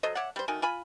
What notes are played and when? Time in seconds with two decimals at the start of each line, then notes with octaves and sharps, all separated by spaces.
0.03 F#3 A4 C5 D#5
0.15 C#5 D5 E5 F#5
0.36 G3 C5
0.48 D#3 A3 F#4 G#5
0.62 F4 G#5 B5